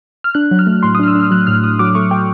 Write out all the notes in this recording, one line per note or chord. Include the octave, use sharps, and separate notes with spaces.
F6
D4 F#6
F#3
F6
A3
A2 C6
D#6
D4 F6
E6
D4 F6
F#3 F#6
A2 F6
A2 D#6
F#3 D6
A3 C#6
A3 G5